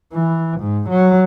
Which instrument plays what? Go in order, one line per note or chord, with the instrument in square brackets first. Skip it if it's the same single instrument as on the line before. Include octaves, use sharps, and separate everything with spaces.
[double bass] E3
G#2
F#3